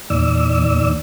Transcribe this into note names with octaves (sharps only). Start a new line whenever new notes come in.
E2 A#2 D#3 D5 E6